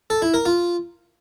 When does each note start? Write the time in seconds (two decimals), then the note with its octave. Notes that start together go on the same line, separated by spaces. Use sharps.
0.10 A4
0.22 E4
0.34 A#4
0.46 F4